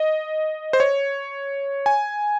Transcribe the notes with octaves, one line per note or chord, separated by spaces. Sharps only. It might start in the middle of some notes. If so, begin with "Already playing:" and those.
Already playing: D#5
C5
C#5
G#5